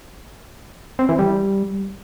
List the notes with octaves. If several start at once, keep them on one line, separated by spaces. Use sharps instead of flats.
C4
E3
G3